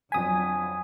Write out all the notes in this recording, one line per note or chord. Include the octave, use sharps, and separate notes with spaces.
G1 F2 F#3 G#5 D#6 B6